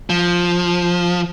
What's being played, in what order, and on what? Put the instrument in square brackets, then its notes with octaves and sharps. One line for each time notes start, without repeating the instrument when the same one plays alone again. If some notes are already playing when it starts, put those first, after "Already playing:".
[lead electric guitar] F3